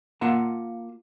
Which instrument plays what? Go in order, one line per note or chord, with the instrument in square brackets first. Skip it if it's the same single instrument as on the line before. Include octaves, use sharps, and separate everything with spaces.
[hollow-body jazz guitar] A#3 F4 F#5 A5 A#5